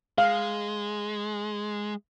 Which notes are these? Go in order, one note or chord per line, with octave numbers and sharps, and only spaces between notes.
G#3 F5